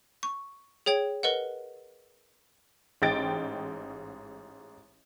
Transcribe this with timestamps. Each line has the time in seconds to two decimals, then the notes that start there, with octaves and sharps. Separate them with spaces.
0.23 C#6
0.86 G#4 C#5 G5 G#6
1.23 A#4 B4 D#5 F#5
3.02 A1 G#2 D#5 G5 A6 D7